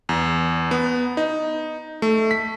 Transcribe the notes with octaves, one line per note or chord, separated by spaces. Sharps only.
E2
B3
D#4
A3
B6